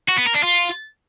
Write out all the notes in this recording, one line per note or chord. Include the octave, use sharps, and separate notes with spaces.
F#4
B3
A#4
D4
F4